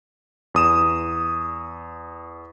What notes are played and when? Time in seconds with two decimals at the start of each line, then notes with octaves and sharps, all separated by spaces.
0.54 E2 D#6 E7